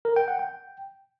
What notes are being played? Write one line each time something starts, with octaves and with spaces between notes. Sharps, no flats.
A#4
G5
F#5
G5